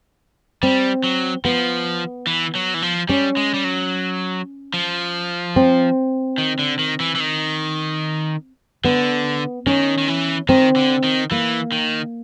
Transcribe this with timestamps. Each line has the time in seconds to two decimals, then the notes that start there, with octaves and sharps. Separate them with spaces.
0.63 G3 C4
1.04 F#3
1.45 F3 B3
2.27 E3
2.55 F#3
2.74 E3
2.82 F3
3.09 G3 C#4
3.37 G#3
3.54 G3
3.64 F#3
4.74 F3
5.56 C4
6.38 D#3
6.59 D3
6.79 D#3
7.00 E3
7.15 E3
7.20 D#3
8.85 D3 B3
9.67 D#3 C#4
9.98 D#3
10.08 E3
10.49 D#3 C4
10.76 D3
11.04 D#3
11.31 E3 A#3
11.72 D#3